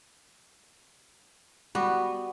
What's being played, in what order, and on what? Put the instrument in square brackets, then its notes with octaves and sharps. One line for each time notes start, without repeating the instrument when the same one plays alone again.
[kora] G3 F#4 [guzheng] B3